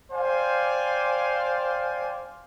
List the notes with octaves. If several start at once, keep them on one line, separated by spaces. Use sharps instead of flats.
C5 D5 F5 G5 G#5